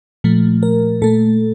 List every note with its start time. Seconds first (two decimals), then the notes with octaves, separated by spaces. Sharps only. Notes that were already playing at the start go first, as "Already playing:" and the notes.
0.24 A#2 F3 A3
0.63 A#4
1.02 A#2 A3 A4